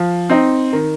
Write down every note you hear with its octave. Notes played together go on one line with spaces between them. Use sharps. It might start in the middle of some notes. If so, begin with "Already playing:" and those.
Already playing: F3
C4 D#4
D#3